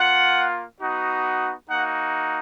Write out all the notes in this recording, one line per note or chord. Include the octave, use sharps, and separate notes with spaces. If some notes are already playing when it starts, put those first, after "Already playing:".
Already playing: A#3 F4 F#5
B3 D#4 F#4
A#3 D#4 F#4 F#5